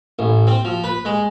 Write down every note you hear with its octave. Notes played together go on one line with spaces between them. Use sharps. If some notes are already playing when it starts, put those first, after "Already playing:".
A1
C4
F3
B4
G#3